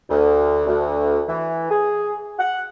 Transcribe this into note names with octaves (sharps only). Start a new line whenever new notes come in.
D2
D2
E3
G#4
F#5